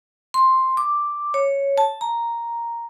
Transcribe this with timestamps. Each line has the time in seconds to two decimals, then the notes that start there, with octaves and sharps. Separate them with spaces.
0.34 C6
0.77 D6
1.34 C#5
1.78 A5
2.01 A#5